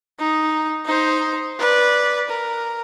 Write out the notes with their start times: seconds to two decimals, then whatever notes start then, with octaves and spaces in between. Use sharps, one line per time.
0.19 D#4
0.85 D#4 C5
1.59 B4 D5
2.30 A#4